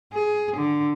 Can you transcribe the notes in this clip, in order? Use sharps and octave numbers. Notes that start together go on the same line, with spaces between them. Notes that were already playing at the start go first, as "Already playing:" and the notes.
G#4
D3